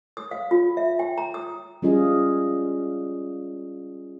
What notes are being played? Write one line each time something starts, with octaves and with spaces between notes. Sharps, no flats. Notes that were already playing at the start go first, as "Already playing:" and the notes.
D#6
F5
F4
E5
G5
A#5
D#6
G3 C#4 F4 G#4 D#5